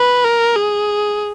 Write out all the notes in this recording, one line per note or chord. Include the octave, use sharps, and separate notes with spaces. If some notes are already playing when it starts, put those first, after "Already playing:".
Already playing: B4
A#4
G#4